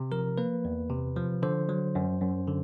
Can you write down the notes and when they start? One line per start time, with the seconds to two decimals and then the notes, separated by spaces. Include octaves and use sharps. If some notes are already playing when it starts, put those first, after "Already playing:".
Already playing: C3
0.12 F3 A#4
0.38 A#3 B4
0.65 E2
0.90 C3
1.16 F3
1.43 D3 C5
1.69 F#3
1.95 F#2
2.21 F#2
2.48 D3